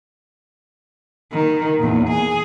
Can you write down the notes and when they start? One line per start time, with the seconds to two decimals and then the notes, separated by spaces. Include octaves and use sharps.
1.32 D#3
1.79 E2 A#2
2.08 G#4